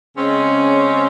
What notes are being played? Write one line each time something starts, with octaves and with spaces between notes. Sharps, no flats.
C#3 G#3 C4 C#4